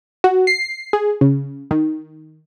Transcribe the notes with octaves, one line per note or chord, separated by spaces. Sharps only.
F#4
C7
G#4
C#3
D#3